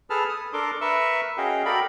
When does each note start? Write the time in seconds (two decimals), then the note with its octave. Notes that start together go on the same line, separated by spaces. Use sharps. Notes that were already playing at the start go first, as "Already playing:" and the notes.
0.10 G#4 A4 B4 A5 F6
0.28 D#6
0.53 D4 A4 A#4 C6 D6
0.81 A#4 B4 E5 C#6 E6
1.38 C#4 F#4 G#4 D#5 F5 G5
1.65 F#4 A4 A#4 D5 G5 B5